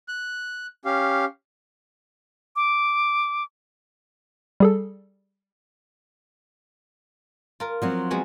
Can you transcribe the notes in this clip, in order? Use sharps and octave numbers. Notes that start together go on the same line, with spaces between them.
F#6
C#4 G4 F5
D6
G3 G#4 A4
F4 A#4
F3 F#3 C4
G#3 B3 F#4